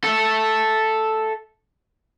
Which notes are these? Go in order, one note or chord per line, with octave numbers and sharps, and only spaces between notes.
A4 E5